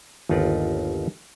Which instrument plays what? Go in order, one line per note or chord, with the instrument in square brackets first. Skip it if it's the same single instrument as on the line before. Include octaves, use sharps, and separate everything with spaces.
[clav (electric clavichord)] G1 D#2 D#4 F4 B4 D5